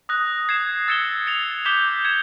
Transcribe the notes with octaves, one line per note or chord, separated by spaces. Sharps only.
D#6 F#6 A#6
G#6 C7 E7
E6 A6 C#7 E7 G7
A6 C#7 F7
D6 G6 B6 E7 G7
G#6 C#7 E7